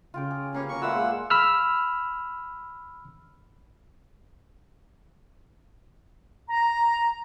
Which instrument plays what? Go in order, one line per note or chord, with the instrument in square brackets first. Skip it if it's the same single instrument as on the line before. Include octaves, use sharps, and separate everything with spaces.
[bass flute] C#3 [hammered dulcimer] F4 G5 D6
[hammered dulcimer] G#4
[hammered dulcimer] A#3 G4 B4 [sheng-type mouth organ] C#4 [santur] F5
[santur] G#5 A#5 [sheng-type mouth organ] C#6
[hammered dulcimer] A#2 G#3 [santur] F4 B4 E5 [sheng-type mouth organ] F#5 E6
[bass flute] G#4 [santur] F5
[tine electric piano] B5 E6 F6
[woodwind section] A#5